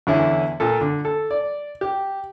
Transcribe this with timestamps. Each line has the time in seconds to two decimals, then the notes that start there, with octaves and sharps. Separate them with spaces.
0.07 E2 D3 C#4 E4
0.60 A#2 A#3 A4
0.81 D3
1.05 A4
1.31 D5
1.81 G4